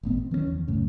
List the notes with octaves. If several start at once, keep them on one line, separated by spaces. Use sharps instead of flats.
G#1 A2 B3 C4
C4
D#3 F3 A#3 C#4
E2
C#2 F#2 A2 C#3